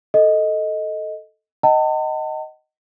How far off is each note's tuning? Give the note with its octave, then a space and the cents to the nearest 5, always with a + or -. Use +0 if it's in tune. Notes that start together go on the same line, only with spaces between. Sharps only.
A4 +0 D#5 +5
D#5 +0 F#5 +45 A5 +40